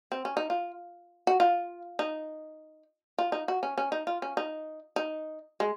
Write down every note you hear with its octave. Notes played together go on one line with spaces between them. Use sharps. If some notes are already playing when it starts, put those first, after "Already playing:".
C4
C#4
D#4
F4
F#4
F4
D#4
F4
D#4
F#4
C#4
C#4
D#4
F4
C#4
D#4
D#4
G#3